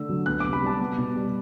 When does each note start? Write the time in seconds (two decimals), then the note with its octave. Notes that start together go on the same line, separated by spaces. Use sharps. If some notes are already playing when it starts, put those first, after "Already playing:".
Already playing: D3 A3 E6
0.09 F#3
0.26 B3 F#6
0.40 C3 D6
0.53 B5
0.62 G3 A5
0.80 B3
0.98 B2
1.16 G3